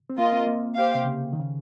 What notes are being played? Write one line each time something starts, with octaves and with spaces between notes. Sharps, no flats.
C4
A#3 F4 A#4 D#5
C4
A#3
G4 C5 F5
C3
C#3
D#3
C#3